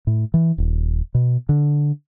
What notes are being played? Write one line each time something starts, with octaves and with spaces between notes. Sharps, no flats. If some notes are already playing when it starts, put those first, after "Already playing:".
A2
E3
D#1
B2
D3